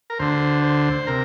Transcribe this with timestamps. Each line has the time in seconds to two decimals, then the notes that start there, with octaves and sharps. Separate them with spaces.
0.10 A#4
0.19 D2 D3 C5
0.63 C5
1.07 C3 A#4